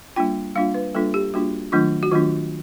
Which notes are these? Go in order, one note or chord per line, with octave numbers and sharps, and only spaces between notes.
G3 A#3 D4 F4 G5
G3 A#3 D4 F4 F5
B4
G3 A#3 D4 F4 A4
G4
G3 A#3 D4 F4 F#4
D#3 F#3 A3 D4 F4
F#4
D#3 F#3 A3 D4 F4